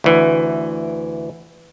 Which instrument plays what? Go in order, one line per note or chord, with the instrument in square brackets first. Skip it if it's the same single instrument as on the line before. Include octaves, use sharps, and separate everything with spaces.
[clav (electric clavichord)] D2 E3